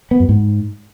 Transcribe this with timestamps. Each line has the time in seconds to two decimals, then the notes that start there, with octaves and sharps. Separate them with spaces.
0.11 B3
0.20 F#2
0.29 G#2